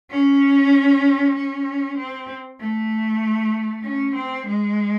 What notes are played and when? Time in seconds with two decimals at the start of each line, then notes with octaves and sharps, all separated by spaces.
0.11 C#4
1.35 C#4
1.97 C4
2.60 A3
3.84 C#4
4.15 C4
4.47 G#3